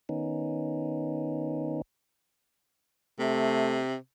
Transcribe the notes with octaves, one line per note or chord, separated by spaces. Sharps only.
D#3 B3 C#4 D#4
C3 A3